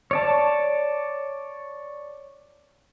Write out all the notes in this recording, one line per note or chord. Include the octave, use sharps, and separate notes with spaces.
C#5 D5 A5